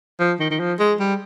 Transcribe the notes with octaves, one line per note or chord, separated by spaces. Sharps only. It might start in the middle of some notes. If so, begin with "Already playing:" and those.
F3
D#3
D#3
F3
G#3
G3